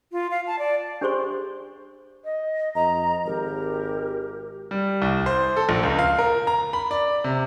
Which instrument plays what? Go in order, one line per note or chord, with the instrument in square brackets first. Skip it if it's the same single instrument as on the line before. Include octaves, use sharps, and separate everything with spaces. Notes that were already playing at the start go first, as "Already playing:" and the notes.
[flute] F4
F5
A5
D5
[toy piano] D4 G4 G#4 C5 C6 C#6
[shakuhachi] D#5
[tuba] F2 [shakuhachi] D#5 [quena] A#5
[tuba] G#1 [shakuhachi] G4 [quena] A#4
[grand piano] G3
C2
C5
A4
A#1
C#2
F5
A#4
A#5
B5
D5
C3